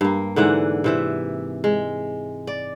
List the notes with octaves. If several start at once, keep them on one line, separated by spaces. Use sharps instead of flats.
G2 A#3
G#2 D3 E3 F#5
C3 E3 E5
G#3
D5